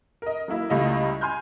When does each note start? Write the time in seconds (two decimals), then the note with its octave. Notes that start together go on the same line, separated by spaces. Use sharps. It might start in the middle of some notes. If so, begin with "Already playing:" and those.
0.22 A#4 D#5
0.48 F#3 A#3 E4
0.70 C#2 G3 A3 E4 F4 D#5
1.21 G#5 C6 F6 G6